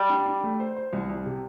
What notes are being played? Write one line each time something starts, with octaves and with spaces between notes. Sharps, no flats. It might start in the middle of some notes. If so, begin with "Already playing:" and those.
Already playing: G3
D4
D4
A3
C5
C5
C2
C2
C3